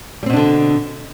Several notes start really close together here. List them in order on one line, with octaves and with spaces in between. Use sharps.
G3 C4 B2 D4 D3